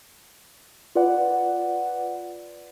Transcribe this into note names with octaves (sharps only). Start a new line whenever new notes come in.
F4 B4 D5 F#5